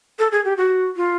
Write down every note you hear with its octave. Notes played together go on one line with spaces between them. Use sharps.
A4
G#4
G4
F#4
F4